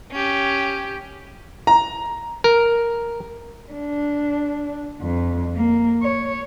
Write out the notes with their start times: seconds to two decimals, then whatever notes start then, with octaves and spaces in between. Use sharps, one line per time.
0.12 C#4 G4
1.67 A#5
2.44 A#4
3.72 D4
5.02 F2
5.55 A#3
6.02 C#5